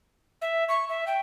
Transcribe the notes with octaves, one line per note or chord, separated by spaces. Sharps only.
E5
C#6
E5
G5